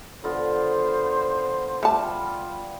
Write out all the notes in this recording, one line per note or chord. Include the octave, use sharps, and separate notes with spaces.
D3 B3 F4 C5
G3 A3 F4 A5